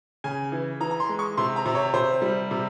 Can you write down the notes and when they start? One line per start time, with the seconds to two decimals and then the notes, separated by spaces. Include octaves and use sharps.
0.24 C#3 G#5
0.52 E3
0.80 E3 A#5
0.91 A#5
1.00 C6
1.09 G#3
1.19 C#6
1.37 C3 C6
1.56 A#5
1.66 C3
1.75 C#5
1.94 C3 C5
2.22 G3
2.51 C3